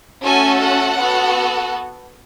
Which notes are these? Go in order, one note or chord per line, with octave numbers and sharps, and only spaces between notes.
A3 C#4 F#4 A4 G#5
F#5
B3 F#4 A4